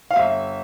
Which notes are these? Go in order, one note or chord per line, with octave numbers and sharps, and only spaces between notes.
F5
G1 E5